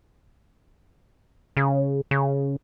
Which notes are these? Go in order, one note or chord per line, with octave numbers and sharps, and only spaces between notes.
C#3
C#3